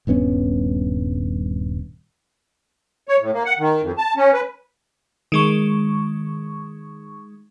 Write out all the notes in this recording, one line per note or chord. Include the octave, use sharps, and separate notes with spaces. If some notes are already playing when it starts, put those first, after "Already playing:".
D#1 G2 B3 C#4
C#5
A2
A#3
F#5
D#3
F2
A5
C#4
B4
D#3 G#3 C#6